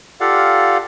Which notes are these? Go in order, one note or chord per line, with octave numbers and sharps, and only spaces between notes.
F4 G4 A4 D5 F5 F#5